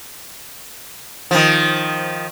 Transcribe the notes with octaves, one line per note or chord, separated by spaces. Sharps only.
D#3 F3